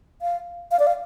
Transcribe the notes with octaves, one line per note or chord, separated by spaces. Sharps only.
F5
F5
D5
F5